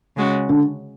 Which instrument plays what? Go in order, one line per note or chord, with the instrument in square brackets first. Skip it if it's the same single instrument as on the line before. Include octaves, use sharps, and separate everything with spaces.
[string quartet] C#3 G#3 C#4 F#4
[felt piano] D3